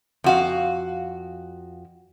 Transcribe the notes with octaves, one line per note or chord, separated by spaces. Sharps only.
F2 F#4 F5